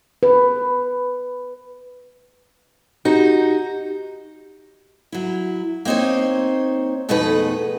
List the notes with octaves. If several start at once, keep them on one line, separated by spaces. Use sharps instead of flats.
B4
D#4 F#4 G4
F#3 E4
A#3 C4 D#4 C5 C#5
F2 B2 A3 D#4 G#4 B4